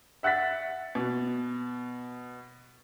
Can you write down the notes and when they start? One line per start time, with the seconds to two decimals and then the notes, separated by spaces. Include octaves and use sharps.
0.23 E5 F#5 F#6 A6 B6
0.95 B2